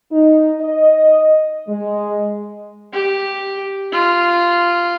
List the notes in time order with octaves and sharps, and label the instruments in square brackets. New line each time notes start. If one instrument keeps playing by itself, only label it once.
[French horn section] D#4
D#5
G#3
[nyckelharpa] G4
F4